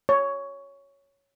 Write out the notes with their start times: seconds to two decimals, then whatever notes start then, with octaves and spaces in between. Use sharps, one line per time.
0.09 C#5